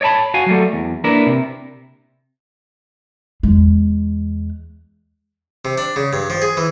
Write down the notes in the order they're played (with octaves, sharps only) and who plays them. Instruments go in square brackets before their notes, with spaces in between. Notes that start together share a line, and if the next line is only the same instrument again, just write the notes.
[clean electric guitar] C#5 D5 E5 A5 B5
F#4 F5 G#5
F#3 G3 A3
E2
A#3 D4 E4 A#4 B4
C3
[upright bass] E2 G#3
[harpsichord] C3
D4
C#3
G2
F3
G#4
E3